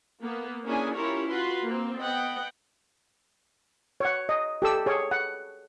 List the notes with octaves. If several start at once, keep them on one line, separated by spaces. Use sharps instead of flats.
A#3 B3
A#3 C#4 D4 E4 G#4 G#5
C#4 E4 F4 G4 A#4 C#5
F4 F#4 B4 C6
A#3 C4
B3 D#5 F#5 G5
C#5 F#5
D#5
G4 A4 E6
G#4 C#5
F#5